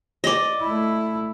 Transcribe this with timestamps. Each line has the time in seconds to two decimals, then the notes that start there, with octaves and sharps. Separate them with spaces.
0.24 D5 D#5
0.61 A3 E4